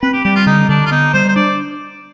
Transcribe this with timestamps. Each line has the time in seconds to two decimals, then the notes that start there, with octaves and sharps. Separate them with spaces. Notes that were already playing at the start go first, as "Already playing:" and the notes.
0.02 C4 B4
0.13 G4
0.24 G3 G4
0.36 F4
0.46 D3 D#4
0.69 D3 D4
0.86 F4
0.91 B3 D#4
1.14 G3 C5
1.28 C5
1.36 D4 D5